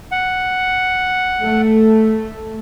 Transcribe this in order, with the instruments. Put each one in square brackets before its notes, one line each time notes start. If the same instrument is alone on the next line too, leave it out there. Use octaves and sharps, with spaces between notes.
[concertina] F#5
[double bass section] A3